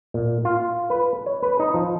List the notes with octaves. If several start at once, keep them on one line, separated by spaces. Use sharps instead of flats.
A#2
F4
B4
C#5
B4
D#4
F3